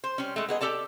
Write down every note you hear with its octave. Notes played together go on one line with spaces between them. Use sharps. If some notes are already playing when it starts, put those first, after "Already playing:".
C5
G3 C#4
G#3 A3
B3 G#4 D#5
G4 A4 D5 A5